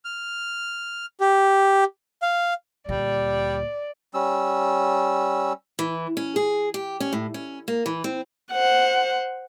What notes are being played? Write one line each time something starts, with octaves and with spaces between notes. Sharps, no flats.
F6
G4
F5
D2 A#2 G3 D5
G3 C#4 E6
E3
C#4
G#4
G4
C#4
A2
C#4
A#3
E3
C4
C5 F#5